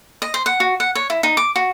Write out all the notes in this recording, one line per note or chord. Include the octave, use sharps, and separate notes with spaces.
D#5
C5
F#5
F#4
F#5
C#5
E4
D#4
D6
F#4